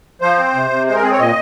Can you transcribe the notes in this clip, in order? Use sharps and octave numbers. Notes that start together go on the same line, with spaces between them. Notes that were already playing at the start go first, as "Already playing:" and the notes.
F3 C5
C4
C3
C3
G#3 C5
A#4
C4 G#4
C#5
A#2 D#5